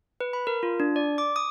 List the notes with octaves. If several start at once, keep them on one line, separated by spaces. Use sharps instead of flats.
B4
B5
A#4
F4
D4
D5
D6
D#6